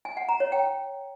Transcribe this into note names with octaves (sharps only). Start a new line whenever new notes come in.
G#5
F#5
A#5
C#5
G5